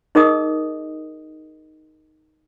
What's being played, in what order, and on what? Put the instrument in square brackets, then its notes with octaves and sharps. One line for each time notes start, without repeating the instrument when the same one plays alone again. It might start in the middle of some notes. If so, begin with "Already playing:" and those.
[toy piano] D#4 G#4 A#4 D#5 D#6